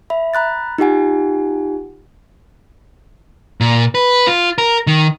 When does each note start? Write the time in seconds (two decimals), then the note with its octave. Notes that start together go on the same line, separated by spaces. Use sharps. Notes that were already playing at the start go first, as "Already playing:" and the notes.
0.10 E5 B5
0.34 A#5 B5 F#6 A6
0.78 D#4 F4 G4 F#5 G#5
3.61 A#2
3.95 B4
4.27 F4
4.58 A#4
4.87 D#3